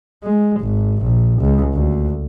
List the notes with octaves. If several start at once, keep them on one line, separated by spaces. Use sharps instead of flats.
G#3
G#1
A#1
C#2
D2